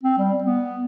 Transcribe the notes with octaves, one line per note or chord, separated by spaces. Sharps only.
C4
G3
B3